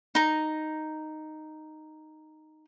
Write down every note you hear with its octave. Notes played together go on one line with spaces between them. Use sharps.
D#4 A#5